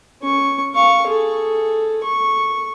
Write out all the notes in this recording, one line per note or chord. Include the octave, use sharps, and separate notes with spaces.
C#4 C#6
F5 C#6
G#4 A4
C#6